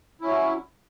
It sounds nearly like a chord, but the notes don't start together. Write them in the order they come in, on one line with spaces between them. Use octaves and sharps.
E4 C#4 F#3